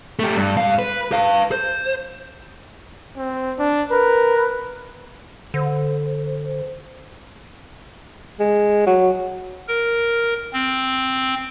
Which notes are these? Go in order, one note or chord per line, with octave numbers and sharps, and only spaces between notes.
A3 G4
G2
G2 F5
B4
B4 F5
C5
C4
D4
A#4 B4
D3 C5
G#3
F#3
A#4
C4